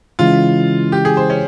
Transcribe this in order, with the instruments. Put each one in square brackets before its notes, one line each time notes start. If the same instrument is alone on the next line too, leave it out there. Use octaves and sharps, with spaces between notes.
[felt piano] C#3 E3 G#3 [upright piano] F4
[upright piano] G4
G#4
C5
C#4